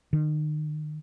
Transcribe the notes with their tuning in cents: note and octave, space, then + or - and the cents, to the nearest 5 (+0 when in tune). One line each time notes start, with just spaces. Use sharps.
D#3 -35